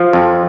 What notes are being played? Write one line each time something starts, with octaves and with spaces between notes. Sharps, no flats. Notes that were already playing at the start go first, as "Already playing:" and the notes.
Already playing: F3 F4
F2